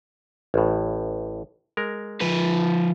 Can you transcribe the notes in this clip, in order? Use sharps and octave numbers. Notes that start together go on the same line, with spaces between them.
A1 A2
G#3 A#4
F3 B4